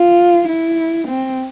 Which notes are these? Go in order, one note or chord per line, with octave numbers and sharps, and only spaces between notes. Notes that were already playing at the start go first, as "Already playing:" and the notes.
Already playing: F4
E4
C4